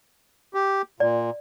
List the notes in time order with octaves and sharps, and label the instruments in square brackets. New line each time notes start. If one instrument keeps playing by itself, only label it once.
[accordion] G4
[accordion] A#2 [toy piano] D5